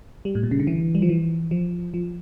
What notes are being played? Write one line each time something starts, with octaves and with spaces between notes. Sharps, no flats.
G3
A2
A#2
C#3
D3
E3
G3
F3
E3
F3
F3